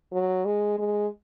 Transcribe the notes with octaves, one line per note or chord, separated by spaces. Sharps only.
F#3
G#3
G#3